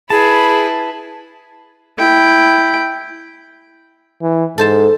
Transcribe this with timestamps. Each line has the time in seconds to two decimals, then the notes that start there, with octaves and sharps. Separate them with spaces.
0.10 E4 G#4 B4 A5
1.98 E4 G5
4.22 E3
4.58 G#2 A4 C5 A5